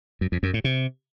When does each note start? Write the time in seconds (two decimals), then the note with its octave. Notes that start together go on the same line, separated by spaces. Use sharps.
0.21 F#2
0.32 F2
0.43 F#2
0.54 A2
0.64 C3